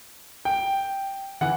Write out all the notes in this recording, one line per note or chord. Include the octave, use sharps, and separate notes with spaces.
G5
E3 F#5